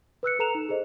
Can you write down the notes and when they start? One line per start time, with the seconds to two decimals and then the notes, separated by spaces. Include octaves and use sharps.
0.23 B4 E6 F#6 C#7
0.39 A4 B4 A#5 E7 F7
0.55 D#4
0.69 G#4 A4 C5 D#5